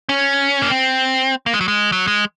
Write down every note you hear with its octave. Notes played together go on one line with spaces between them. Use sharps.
C#4
A#3
C4
A#3
G#3
F#3
G#3
F#3
G#3